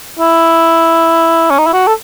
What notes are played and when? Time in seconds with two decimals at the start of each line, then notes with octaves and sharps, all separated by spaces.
0.20 E4
1.51 C#4
1.59 D#4
1.67 E4
1.73 F#4
1.87 A4